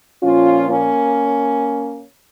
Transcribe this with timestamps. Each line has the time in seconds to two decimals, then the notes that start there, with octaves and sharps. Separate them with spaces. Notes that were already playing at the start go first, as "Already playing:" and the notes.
0.23 A#2 F3 A#3 C#4 F4
0.70 A#3 C#4